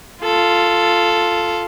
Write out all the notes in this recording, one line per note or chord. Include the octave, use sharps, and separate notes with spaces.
F4 A4